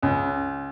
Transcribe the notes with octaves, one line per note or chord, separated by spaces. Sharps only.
C#2